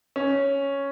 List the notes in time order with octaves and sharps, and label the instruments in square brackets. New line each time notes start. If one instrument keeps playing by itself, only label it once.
[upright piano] C#4